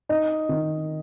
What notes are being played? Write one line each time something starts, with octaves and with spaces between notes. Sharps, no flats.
D#4
D#3